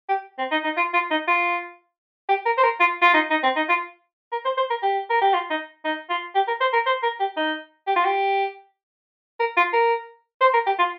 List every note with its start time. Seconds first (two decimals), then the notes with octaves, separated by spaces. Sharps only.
0.09 G4
0.38 C4
0.51 D#4
0.64 D#4
0.77 F4
0.94 F4
1.11 D#4
1.27 F4
2.29 G4
2.46 A#4
2.57 C5
2.63 A#4
2.80 F4
3.02 F4
3.14 D#4
3.30 D#4
3.43 C4
3.56 D#4
3.69 F4
4.32 A#4
4.45 C5
4.57 C5
4.70 A#4
4.83 G4
5.10 A#4
5.21 G4
5.34 F4
5.50 D#4
5.85 D#4
6.09 F4
6.35 G4
6.47 A#4
6.61 C5
6.73 A#4
6.86 C5
7.03 A#4
7.20 G4
7.37 D#4
7.87 G4
7.96 F4
8.05 G4
9.39 A#4
9.57 F4
9.73 A#4
10.41 C5
10.53 A#4
10.66 G4
10.78 F4